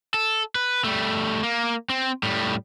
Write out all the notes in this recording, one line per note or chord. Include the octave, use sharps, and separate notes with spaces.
A4
B4
G3 A3
A#3
C4
A2 G3